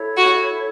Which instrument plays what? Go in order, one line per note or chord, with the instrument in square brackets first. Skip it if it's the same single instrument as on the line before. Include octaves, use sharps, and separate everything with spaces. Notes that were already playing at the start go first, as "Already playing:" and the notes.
Already playing: [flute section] E4 A4 C#5
[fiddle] F#4